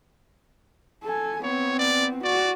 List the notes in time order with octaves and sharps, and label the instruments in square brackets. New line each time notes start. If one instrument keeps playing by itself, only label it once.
[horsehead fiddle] A4 G#5
[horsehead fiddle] B3 C4 [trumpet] C#5
[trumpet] D5
[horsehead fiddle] F#4 [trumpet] D5